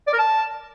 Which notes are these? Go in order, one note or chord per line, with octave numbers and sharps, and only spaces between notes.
D5
A#4
A5